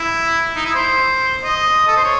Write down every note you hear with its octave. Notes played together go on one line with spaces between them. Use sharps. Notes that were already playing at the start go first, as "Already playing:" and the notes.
Already playing: E4
D#4
E4
C5
D#5
A4
C5
C#5